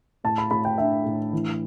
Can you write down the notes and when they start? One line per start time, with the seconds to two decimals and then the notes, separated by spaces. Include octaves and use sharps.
0.24 A2 A5
0.38 B5
0.51 A2 B5
0.65 G5
0.78 D4 E5
1.05 A2
1.33 E3